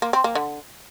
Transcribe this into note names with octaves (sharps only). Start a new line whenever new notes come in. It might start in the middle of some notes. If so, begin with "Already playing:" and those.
A#3
C4
A#3
D3